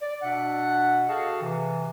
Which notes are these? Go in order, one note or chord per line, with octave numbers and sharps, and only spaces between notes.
D5
B2 D4 E5 F#5
F#4 G#4 A4 F5 G5 A5
C3 E3